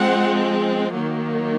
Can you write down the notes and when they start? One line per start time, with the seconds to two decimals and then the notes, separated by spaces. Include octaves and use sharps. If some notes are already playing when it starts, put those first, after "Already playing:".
Already playing: F3 G#3 C4 F#5
0.94 D#3 F#3 A#3